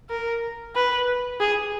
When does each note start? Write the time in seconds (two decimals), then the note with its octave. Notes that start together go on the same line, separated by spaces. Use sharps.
0.10 A#4
0.75 B4
1.40 G#4